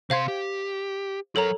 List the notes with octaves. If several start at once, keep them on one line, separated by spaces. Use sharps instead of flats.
C3 C5 F5 C6 G#6
G4
F#3 A4 A#4 C#5 A#5